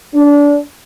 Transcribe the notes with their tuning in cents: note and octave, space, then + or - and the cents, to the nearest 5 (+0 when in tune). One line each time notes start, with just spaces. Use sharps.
D4 -25